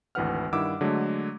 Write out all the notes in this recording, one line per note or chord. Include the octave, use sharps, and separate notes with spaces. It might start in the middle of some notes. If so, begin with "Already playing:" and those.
G#1 D2 E3 B4 F#5 F6
G2 D#3 E4 F#5 D6 E6
D3 F#3 G#3 A3